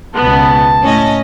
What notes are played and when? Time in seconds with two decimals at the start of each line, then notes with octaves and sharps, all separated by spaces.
0.16 C#2 B2 B3 A5
0.81 A2 C#4 D#5